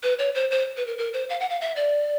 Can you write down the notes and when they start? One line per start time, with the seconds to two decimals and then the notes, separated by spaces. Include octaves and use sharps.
0.03 B4
0.19 C#5
0.35 C5
0.51 C5
0.77 B4
0.87 A#4
0.98 A#4
1.13 C5
1.29 F5
1.40 F#5
1.50 F5
1.61 E5
1.76 D5